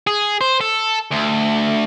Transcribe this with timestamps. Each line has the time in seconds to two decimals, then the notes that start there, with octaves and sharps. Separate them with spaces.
0.07 G#4
0.41 C5
0.61 A4
1.12 D2